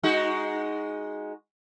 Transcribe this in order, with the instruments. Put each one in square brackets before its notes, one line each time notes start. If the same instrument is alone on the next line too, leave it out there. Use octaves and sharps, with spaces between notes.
[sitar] G#3 D#4 F#4